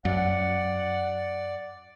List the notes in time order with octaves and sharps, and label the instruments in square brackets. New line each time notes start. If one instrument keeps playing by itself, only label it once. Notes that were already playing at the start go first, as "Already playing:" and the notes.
[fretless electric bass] F#2 [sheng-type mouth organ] D5 [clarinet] F#5